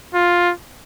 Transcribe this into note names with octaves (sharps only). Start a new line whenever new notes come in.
F4